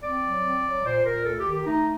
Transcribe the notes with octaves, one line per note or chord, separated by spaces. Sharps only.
C4 D5
F#3
C4
F#3
A#2 C5
A#2 A#4
D2 A4
G4
D#3
G4
A3 D#4